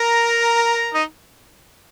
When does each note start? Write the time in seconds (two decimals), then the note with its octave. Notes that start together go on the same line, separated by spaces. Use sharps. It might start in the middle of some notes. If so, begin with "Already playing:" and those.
Already playing: A#4 A#5
0.94 D#4 D#5